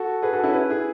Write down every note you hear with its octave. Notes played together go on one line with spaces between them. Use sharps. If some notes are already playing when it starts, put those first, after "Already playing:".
Already playing: F#4 A4
G#4 B4
F#4 A4
C#4 E4
G#4 B4
E4 G#4